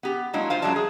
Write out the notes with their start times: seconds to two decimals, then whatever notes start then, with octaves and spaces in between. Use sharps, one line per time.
0.03 B3 G4
0.33 F#3 G#3 A#3 D4 E4
0.50 F4 C5 F5
0.62 F#2 D#3 F#3 G#3 D5 A5
0.76 G#4